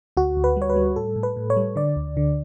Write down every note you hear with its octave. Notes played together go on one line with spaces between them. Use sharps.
D2 F#4
D2
B4
G3
C#5
B4
G3
A2 A4
A2
B4
A2
C#5
G3
D3 D5
D2
D3